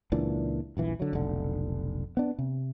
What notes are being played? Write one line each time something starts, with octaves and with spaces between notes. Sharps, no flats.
C#2 A#2 E3 D4
D#1 A#1 E3
D3 F#3
F1 B1 D3
B3 D4
C3